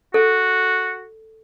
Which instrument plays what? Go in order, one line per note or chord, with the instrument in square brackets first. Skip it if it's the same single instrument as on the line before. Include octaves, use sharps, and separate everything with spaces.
[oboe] F#4 [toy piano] A4